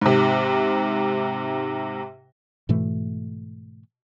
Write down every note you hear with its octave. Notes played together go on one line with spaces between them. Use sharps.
G#2 C3
G#2 B2 E3 A3